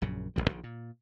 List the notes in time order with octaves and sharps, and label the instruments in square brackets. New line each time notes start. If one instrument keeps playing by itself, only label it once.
[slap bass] A#1 F#2 C#3
E1 A1 F#2 G3
A#1 D3 D#3
A#2